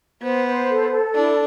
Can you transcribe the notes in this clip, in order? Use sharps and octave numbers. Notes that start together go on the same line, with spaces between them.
B3 C5
C5
A4
A4
D4 E4